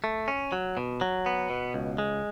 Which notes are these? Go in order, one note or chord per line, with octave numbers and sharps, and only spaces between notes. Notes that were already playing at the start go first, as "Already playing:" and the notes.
A3
C#4
F#3
B2
F#3
B3
B2
C#2
G#3